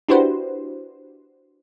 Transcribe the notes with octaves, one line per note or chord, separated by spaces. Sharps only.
D4 E4 F#4 G4 B4 C5